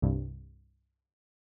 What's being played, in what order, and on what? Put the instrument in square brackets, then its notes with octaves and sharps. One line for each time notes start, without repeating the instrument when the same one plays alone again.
[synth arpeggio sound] C2 G2 C3